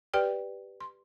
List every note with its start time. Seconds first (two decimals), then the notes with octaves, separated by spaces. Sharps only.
0.14 G4 B4 D5 G5 F6
0.81 C6